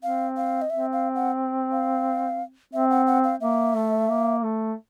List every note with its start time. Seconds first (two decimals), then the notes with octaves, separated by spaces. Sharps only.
0.02 C4 F5
0.37 F5
0.62 D#5
0.70 C4 E5
0.93 F5
1.15 F#5
1.72 F5
2.73 C4 E5
2.90 F#5
3.07 F#5
3.24 F5
3.41 A#3 E5
3.75 A3
4.09 A#3
4.43 A3